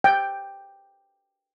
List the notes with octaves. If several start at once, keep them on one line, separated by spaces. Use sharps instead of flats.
G5